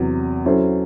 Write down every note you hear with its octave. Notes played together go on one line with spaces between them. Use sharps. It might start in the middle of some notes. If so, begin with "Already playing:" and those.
Already playing: E2 C3 F#3
F#3 C#4 E4 A4 C5